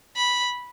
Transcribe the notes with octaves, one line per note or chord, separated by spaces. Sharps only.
B5